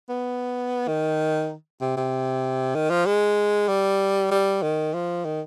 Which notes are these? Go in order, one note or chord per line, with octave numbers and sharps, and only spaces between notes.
B3
D#3
C3
C3
D#3
F3
G#3
G3
G3
D#3
F3
D#3